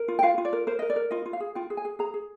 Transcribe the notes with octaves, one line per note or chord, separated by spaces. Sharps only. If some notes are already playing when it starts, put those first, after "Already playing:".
Already playing: A#4
F4
G5
F4 F5
F4
D5
A#4
A#4 C5
A#4 D#5
D5
A#4
F4 D#5
F4
F5
G#4
F4 G5
G#4
G#5
G#4
G#4 A#5
G#4